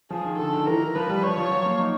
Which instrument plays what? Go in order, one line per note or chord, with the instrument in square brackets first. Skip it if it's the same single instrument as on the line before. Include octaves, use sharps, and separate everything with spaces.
[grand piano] F3 [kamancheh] G#4
[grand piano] D#3
[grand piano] D3 [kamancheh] A4
[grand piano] D#3
[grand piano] E3 [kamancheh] A#4
[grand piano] E3
[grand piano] F3 [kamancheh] B4
[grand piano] G3
[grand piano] F3 [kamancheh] C#5
[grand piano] F3
F#3
A#3
D#4